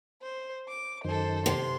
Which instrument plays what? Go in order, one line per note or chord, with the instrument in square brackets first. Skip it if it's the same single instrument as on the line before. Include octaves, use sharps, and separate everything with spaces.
[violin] C5
D6
[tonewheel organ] F#2 D#3 [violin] A4 C5
[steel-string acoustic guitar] C3 [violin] C6